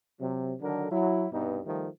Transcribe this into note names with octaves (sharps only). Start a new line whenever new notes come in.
C3 F#3
D3 D#3 F#3 D4 A4 A#4
F#3 E4
C2 G2 B2 B3 D#4
D#3 F3 G3 A3